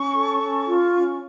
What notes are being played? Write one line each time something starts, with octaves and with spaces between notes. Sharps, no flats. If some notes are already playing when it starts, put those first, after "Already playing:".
Already playing: C#4 C#6
A4
C#4
F4
C#4